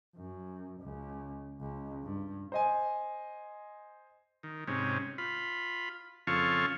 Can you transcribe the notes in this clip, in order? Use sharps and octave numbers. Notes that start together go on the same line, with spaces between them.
F#2
C#2
C#2
G2
C5 D#5 G#5
D#3
G#2 C3 C#4
F4 B5
F2 C#3 F4 A4 F5 C#6